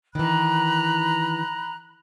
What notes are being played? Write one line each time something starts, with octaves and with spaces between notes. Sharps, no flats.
D#3 E3 A#5 B5 F#6